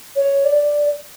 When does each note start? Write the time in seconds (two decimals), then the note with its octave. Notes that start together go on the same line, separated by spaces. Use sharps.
0.16 C#5
0.45 D5